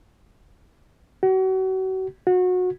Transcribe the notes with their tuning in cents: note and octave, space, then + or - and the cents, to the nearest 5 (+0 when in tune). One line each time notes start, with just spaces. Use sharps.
F#4 +35
F#4 -25